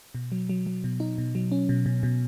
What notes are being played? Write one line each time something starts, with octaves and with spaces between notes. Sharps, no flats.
B2
F#3
F#3
F#3
B2
D#4
B2
F#3
C#4
B2
B2
B2